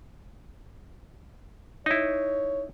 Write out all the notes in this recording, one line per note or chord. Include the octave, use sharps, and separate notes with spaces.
D#4 E4 C#5